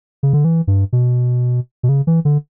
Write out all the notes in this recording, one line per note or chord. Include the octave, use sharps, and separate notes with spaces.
C#3
D3
E3
G2
B2
B2
C#3
E3
D3